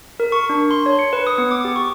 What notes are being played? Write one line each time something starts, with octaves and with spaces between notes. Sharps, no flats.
A#4
C#6
D4
C6
C#5
C#7
B4
D#6
B3
D6
G4
C#6